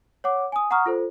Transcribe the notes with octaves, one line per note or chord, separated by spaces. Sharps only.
C#5 F#5 D6
G#5 D#6
F#5 A#5 C#6 D#6 F6
F4 A4 C5